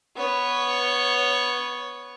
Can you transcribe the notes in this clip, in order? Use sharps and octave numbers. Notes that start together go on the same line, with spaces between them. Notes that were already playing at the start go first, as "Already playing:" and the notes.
B3 C#5